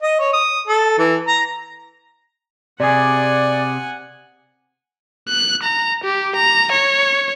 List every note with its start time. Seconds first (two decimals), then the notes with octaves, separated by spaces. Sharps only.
0.02 D#5
0.20 C#5
0.33 D#6
0.68 A4
0.98 E3
1.28 A#5
2.80 C3 G#4 D5 F#5 G#5
5.29 F#6
5.63 A#5
6.04 G4
6.36 A#5
6.72 C#5